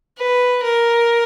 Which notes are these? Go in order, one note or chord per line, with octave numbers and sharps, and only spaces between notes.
B4
A#4